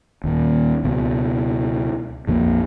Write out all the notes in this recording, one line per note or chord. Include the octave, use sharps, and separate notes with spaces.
D#2 A#2
C#2 B2
A#1 F2 F3 A#3